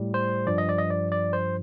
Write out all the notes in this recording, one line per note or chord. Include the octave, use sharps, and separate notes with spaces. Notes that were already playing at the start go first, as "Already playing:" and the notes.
Already playing: A2 G3
C5
G2 F3 D5
D#5
D5
D#5
D5
D5
C5